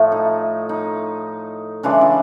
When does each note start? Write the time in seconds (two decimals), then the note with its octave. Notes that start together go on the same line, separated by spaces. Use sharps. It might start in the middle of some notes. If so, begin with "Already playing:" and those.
Already playing: A2 F3 A3
0.12 D#4
0.69 D#4
1.83 C#3 E3 G#3 D4
2.01 E4